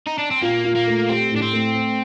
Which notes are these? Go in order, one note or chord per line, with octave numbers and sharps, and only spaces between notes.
D#4
D4
C4
A#2 A#3
A#2
A#3
A3
C4 G4
A2
D4
C4
A3
C5